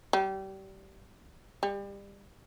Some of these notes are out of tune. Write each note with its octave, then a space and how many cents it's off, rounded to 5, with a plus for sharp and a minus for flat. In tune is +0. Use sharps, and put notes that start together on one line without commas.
G3 -25
G3 +30